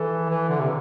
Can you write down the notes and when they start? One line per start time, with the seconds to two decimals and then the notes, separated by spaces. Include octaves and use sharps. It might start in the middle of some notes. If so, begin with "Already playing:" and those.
Already playing: E3 A4
0.30 E3
0.49 D3
0.60 C3